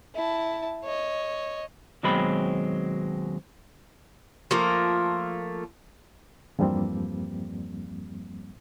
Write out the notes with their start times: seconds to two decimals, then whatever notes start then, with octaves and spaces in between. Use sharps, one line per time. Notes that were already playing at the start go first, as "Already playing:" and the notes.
0.15 E4 A5
0.84 C#5 D#5
2.03 D#2 B2 F#3 G#3 C4 B5
4.51 F3 A3 A#3 A#4
6.59 E2 G2 F3 G3 A#3 C4